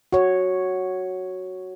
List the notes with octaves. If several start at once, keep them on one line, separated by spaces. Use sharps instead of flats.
F#4 C#5